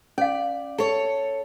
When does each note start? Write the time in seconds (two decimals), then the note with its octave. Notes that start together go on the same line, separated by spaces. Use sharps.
0.18 C#4 D5 F5
0.78 A4 C#5